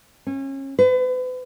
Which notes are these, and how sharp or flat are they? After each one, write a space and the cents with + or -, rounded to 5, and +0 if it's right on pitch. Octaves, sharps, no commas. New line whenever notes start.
C#4 -30
B4 +40